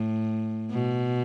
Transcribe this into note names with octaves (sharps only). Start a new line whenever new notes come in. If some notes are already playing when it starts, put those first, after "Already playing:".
Already playing: A2
B2